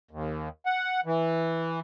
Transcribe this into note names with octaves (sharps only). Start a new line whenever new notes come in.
D#2
F#5
E3